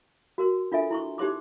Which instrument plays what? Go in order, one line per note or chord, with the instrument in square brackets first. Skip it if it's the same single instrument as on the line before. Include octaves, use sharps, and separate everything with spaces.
[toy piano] F#4 A#4 C6
D4 F4 A4 E5 G#5
E4 C6 C#6
D#4 G4 C5 C6 D6